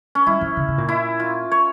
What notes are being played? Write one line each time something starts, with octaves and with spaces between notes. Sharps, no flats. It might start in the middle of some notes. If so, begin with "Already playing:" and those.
C#4
G3 E4
F3
C#3
C#3
A#2
E4
F4
C#5